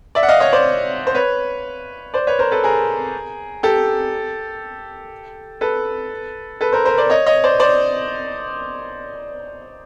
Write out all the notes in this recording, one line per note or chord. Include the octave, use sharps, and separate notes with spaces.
D5 E5
F#5
D#5 F5
C#5 D#5
C5 D5
C5
B4 C#5
C5 D5
B4 C#5
A#4 C5
A4 B4
G#4 A#4
G4 A4
A4 B4
A4 B4
A#4 C5
A#4 C5
C5 D5
C#5 D#5
C#5 D#5
C5 D5
C5 D5